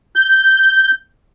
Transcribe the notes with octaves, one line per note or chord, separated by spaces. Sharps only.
G6